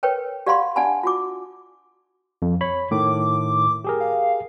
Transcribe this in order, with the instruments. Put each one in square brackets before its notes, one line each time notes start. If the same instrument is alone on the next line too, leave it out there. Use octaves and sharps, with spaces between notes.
[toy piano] A#4 B4 C#5 G5
G4 D5 F5 F#5 B5 C6
D4 D5 F#5 G#5 A5 B5
F4 F#4 D6
[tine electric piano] F2
C#5 B5
[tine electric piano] A2 D#3 [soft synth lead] D6
[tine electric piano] G4 G#4 A#4
[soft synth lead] F5